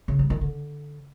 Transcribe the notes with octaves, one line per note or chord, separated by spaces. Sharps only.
C#3
G3
D#3
D3